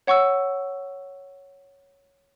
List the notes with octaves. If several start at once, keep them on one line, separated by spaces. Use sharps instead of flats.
C#5 F#5 C#6 E6